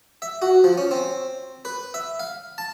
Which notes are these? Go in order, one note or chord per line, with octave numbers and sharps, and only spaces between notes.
E5
F#4
F3
C#4
C4
B4
E5
F5
A5